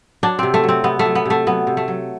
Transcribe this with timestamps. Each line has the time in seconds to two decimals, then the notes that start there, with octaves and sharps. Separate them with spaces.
0.23 F#3 D4
0.39 C3 C4
0.54 A3
0.64 F#3 C4
0.84 C3 B3
0.99 A3
1.06 F#3
1.15 B3
1.25 C3 A3
1.47 F#3 B3
1.67 C3
1.77 A3
1.88 F#3